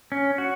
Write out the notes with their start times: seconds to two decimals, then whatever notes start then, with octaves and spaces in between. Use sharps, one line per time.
0.12 C#4
0.38 F#4